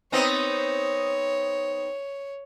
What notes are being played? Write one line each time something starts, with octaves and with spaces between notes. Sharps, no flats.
B3 C4 D#4 C#5